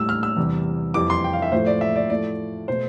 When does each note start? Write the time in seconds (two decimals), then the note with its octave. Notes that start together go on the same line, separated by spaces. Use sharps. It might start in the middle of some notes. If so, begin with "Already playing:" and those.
Already playing: A2 G3 E6
0.09 F6
0.23 E6
0.37 E2 C3 G3
0.94 F2 E3 G3 D6
1.10 C6
1.24 G5
1.33 F5
1.42 E5
1.52 A2 F3 A3 C5
1.66 D5
1.81 E5
1.96 D5
2.10 A2 F3 A3 D5
2.68 B2 A3 C5